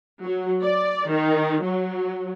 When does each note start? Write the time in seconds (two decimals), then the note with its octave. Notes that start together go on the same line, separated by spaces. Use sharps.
0.24 F#3
0.63 D5
1.10 D#3
1.63 F#3